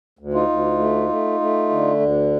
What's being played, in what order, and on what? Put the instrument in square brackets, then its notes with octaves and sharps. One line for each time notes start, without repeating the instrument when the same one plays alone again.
[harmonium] D2
D#4 F4
D2
A3
A3
A3
D3
D2